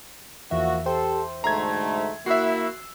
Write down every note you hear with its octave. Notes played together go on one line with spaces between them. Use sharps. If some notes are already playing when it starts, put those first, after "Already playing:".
E2 E3 F3 A#3 F#4 E5
G4 A4 C5 G5 C6
D2 G#2 A3 E5 A#5 C6 G#6
A#3 E4 F#4 E5 E6 F#6 C7